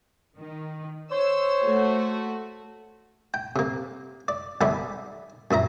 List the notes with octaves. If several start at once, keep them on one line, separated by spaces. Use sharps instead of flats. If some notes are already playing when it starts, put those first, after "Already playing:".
D#3
C5 C#5 E6
A3 F#4
G5
C3 A#3
D5
B1 G#2 D#3 D5 E5 B5
F#2 A#2 E5 A#5